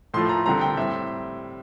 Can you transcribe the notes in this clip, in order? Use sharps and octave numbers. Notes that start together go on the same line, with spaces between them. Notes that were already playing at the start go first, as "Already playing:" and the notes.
A2 F3 A3 C6
A#5
D3 G3 C4 A#5
G5
A2 G3 C4 E5